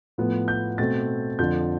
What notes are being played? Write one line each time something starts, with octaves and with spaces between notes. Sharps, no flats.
A2 F3 B3
G6
B2 A3 C4 A6
F2 D3 F3 G6